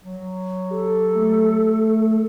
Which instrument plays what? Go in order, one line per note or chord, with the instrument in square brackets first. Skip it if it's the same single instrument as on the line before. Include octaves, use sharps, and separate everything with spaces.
[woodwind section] F#3
[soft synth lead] G4 [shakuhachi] A4
[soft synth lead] A3